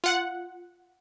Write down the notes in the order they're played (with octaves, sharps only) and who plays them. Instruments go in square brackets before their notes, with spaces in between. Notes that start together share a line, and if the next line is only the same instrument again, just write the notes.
[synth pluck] F4 F#5